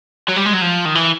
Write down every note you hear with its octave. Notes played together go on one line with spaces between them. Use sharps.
F#3
G3
G#3
F#3
F3
D#3
E3